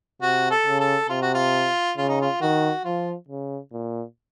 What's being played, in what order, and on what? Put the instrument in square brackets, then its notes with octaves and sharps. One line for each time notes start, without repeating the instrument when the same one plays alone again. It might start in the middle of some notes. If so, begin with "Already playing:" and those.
[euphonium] C3 [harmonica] F#4
[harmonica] A4
[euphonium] C#3
[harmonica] A4
[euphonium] C3 [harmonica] F4
[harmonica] F#4
F4
[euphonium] C#3 [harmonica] F4
[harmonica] D#4
F4
[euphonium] D#3 [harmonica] F#4
[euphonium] F3 [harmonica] F4
[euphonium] C#3
A#2